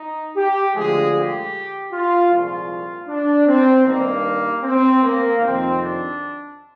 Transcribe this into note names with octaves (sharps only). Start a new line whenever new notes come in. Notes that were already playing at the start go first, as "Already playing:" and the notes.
Already playing: D#4
G4
D2 D3 F3 G#3 G#4
G4
F4
C2 A#2 F3 G#3 F4
D4
C4
G2 D#3 G3 A#3
C4
A#3
F2 C3 D#3 C4
D4